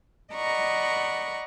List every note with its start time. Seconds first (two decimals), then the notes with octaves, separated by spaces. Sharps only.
0.34 D5 D#5 F#5 A#5 B5 C#6